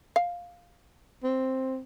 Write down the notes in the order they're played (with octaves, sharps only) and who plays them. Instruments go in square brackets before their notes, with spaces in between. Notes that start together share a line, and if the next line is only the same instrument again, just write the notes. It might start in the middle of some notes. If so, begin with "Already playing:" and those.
[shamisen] F5
[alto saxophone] C4